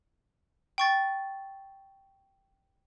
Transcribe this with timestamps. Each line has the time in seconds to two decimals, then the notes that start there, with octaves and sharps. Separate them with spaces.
0.78 G5 C#6 A6